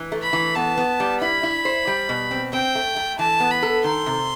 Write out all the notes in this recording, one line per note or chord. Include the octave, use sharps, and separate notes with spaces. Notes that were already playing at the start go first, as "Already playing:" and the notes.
Already playing: E3
A3
B5
E3
B3 A5
B3
G3
E4 B5
E4
C5
G3
B2
C4
C4 G5
A3
A3
E3 A5
B3
B5
A4
D#3 C6
C3